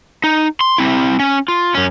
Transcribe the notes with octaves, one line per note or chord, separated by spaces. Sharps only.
D#4
C6
C4 E4
C#4
F4
F#2 C#4